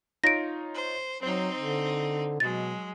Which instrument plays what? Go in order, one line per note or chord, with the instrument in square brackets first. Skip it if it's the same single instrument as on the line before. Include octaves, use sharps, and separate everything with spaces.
[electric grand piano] D#4 F4 C#5 [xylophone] A#6 D7
[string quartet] C5
[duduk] F#3 [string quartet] C4 D#4 [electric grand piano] C5
[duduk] D3
[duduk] B2 [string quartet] F#3 G#3 [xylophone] A6